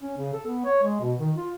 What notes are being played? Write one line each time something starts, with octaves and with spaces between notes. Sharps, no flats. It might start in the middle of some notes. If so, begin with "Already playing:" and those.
C#4
C#3
A4
B3
C#5
G#3
B2
D#3
F4